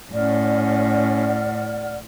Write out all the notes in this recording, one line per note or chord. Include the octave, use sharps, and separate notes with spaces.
A2 C#4 D5 F#5 F6